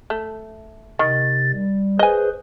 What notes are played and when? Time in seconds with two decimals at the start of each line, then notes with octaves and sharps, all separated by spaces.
0.10 A3
0.99 C3 D#3 A6
1.53 G3
1.99 G#4 B4 C5 D#5 G#5